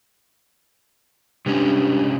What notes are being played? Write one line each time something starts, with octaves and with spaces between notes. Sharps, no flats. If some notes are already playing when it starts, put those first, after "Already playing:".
G2 C3 G#3 C#4